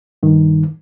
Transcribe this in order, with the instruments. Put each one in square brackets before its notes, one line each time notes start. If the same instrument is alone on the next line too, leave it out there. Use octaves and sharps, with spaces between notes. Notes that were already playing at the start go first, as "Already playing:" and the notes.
[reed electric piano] G2 D#3